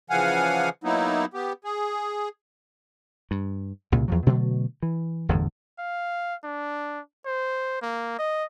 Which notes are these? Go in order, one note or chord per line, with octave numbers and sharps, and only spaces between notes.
C#3 E3 F3 F5 F#5 G#5
F#3 A#3 B3 D#4 E4
B3 G4
G#4
G2
C2 A#2 C#3
E2 F3 F#3
B2 D3 F#3 A3
E3
G1 E2 A2 D3
F5
D4
C5
A#3
D#5